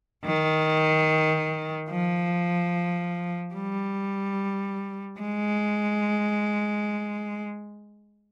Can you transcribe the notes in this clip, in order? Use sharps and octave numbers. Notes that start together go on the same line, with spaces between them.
D#3
F3
G3
G#3